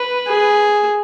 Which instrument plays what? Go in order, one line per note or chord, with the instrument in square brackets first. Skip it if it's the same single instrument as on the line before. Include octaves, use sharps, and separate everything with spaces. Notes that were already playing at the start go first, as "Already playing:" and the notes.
Already playing: [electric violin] B4
[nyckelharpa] G#4